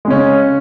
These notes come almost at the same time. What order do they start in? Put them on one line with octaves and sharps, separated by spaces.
G#3 C#3 C#4